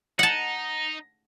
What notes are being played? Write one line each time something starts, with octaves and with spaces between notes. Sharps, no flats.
D#4 F#5 A5